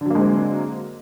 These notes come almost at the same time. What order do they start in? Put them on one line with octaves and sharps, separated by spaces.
D3 F#3 A#3 G#3 C4